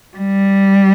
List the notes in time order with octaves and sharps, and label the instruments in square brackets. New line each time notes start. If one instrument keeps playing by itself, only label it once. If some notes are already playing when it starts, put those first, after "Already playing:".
[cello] G3